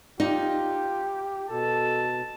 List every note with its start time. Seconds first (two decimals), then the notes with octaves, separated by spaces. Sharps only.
0.20 D#4 F4 G4
1.49 B2 A4 A5